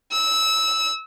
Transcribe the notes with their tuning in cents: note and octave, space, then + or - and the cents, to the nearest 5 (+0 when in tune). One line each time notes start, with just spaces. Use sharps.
E6 -20